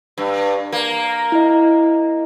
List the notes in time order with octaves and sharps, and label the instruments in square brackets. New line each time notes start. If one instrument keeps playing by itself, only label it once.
[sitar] G2
A#3
[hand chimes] E4 D#5